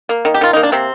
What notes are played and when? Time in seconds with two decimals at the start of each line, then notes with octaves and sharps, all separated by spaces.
0.09 A#3
0.25 D#3
0.34 G4
0.41 D#3 F4
0.53 A#3 D#4
0.63 D4
0.72 C3 C4